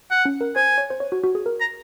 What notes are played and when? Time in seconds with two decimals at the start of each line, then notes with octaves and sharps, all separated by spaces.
0.11 F#5
0.25 C#4
0.41 A#4
0.56 C5 G#5
0.78 C#5
0.90 C5
1.00 C#5
1.12 F#4
1.23 F#4
1.35 G#4
1.46 A#4
1.61 A#5